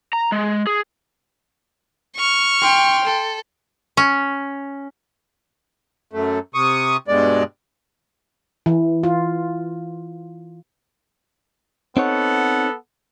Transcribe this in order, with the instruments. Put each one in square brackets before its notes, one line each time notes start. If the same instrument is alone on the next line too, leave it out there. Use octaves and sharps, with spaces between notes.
[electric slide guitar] A#5
G#3
G#4
[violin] C#6 F6
[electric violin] G5 C6
[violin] A4
[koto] C#4
[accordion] F#2 A3
C3 C#6 D#6
G2 B2 G#3 D5
[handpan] E3
F4
[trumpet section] B3 A4 F#5 [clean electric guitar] C4 D#4 C#5